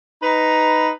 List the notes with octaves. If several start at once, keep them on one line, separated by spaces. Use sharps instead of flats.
D#4 B4 A#5